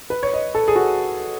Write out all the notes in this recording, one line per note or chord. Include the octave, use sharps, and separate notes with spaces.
B4
C#5
D#5
A4
G#4
F#4